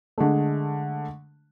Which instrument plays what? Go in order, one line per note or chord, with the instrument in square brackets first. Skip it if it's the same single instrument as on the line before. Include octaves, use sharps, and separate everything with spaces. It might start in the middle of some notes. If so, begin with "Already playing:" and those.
[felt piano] D3 G#3 A3